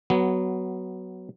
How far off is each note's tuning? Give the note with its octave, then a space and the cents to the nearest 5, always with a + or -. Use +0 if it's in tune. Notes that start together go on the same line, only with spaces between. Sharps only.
F#3 +10 B3 +0